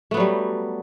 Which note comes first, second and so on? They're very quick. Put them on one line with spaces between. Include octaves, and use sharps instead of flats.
A3 B3 F#3 G3